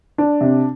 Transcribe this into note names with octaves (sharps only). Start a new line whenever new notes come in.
D4
C3